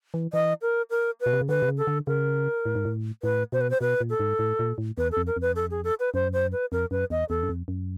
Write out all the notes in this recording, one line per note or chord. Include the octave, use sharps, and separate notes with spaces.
E3
E3 D#5
A#4
A#4
B4
B2
C3
C#3
D3 B4
C3
C#3
A4
D3
C#3 A#4
A2
G#2
A2
A2 B4
B2 C5
B4
C5
B2 B4
A#2
A4
G#2
A2
A#2
A2
E2 B4
A4
F2
A#4
F2 B4
A4
G#4
A4
B4
F#2 C5
C5
B4
F2 A#4
F#2 B4
E2 D#5
E2 A4
F#2
F2
F#2